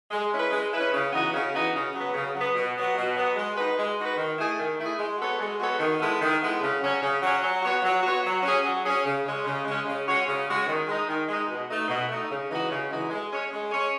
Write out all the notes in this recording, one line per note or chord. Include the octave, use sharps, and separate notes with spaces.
G#3
C#4 E4 B4
G#3
C#4 E4 B4
C#3
E3 B3 D#4 F#4
C#3
E3 B3 D#4 F#4
C#3
F#3 B3
C#3
F#3 B3
B2
F#3 B3
B2
F#3 B3
G#3
D#4 F#4 B4
G#3
D#4 F#4 B4
D#3
A3 E4 G#4
D#3
A3 E4 G#4
G#3
B3 F#4 A4 C#5
G#3
B3 F#4 A4 C#5
D#3
G#3 B3 E4 A4
D#3
G#3 B3 E4 A4
C#3
F#3 C#4
C#3
F#3 C#4
F#3
B3 F#4 C#5
F#3
B3 F#4 C#5
F#3
C#4 G#4
F#3
C#4 G#4
C#3
G#3 C#4
C#3
G#3 C#4
C#3
G#3 C#4 F#4 C#5
C#3
G#3 C#4 F#4 C#5
D#3
G#3 D#4
D#3
G#3 D#4
B2
A3 D#4
B2
A3 D#4
C#3
E3 G#3 D#4 F#4
C#3
E3 G#3 D#4 F#4
G#3
C#4 G#4 C#5
G#3
C#4 G#4 C#5